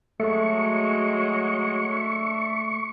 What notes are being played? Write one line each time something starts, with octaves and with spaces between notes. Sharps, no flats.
F#3 G#3 A3 C#6
D4 A4 E5